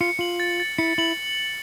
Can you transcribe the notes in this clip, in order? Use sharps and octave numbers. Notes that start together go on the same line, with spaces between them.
F4 C#7
F4 F#7
A6
A6
E4 C#7
E4 F#7